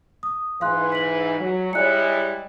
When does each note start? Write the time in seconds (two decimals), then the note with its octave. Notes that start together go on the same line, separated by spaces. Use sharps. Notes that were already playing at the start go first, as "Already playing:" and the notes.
0.23 D#6
0.61 G#2 E3 F5 C6 F#6
0.92 B6 F#7
1.39 F#3
1.73 G3 G#3 E4 C#5 F#6 C#7